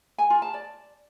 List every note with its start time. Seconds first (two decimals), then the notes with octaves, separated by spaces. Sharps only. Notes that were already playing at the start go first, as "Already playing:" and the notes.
0.18 G#5
0.30 F4
0.42 A5
0.54 D5